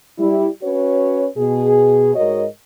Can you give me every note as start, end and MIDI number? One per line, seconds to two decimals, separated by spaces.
0.18 0.48 55
0.18 0.48 64
0.63 1.26 61
0.63 1.26 66
0.63 1.26 71
0.63 1.26 73
1.36 2.15 47
1.36 2.15 68
2.15 2.45 44
2.15 2.45 66
2.15 2.45 70
2.15 2.45 73
2.15 2.45 75